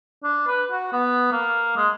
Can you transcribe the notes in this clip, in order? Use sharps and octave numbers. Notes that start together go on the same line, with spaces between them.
D4
B4
F#4
B3
A#3
G#3